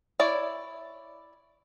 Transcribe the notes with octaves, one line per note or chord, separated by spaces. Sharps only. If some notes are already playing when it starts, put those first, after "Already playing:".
E4 C#5 D5